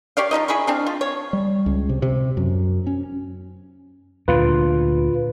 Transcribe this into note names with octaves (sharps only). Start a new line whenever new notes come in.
G4 C#5 D5 F5
F3 G3 D#4 D#5
E4 G#4 B5 C#6
C4 D4 F5
F4
C#5
G3
C#2
C3
C3
F#2
C#4
D2 A#2 F4 B4